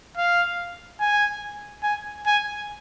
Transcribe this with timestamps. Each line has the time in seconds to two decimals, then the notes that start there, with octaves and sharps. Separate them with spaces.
0.17 F5
1.00 G#5
1.83 G#5
2.26 G#5